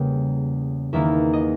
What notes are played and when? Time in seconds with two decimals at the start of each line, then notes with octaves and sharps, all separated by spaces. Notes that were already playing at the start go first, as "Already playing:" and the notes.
Already playing: E2 C#3 G3 A#3 G5
0.93 E2 D#3 A#3 E4 E5
1.33 D#5